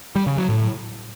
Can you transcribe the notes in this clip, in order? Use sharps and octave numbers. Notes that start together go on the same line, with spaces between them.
G3
C#3
F#3
A2